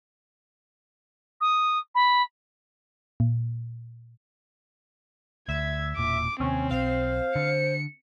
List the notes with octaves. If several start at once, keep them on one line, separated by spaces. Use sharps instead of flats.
D#6
B5
A#2
D2 E5 G#6
E1 A#2 D6
D#2 C3 C4 C#4
B1 C5 F5
D3 C#7